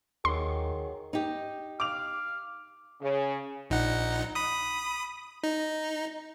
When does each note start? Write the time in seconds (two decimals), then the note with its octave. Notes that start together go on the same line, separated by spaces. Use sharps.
0.25 D#2 D#3 F#3 G#4 C6
1.13 D#4 G4
1.80 F5 D6 F7
3.01 C#3
3.70 A#1 D#4 F#5
4.35 B5 D#6
5.43 D#4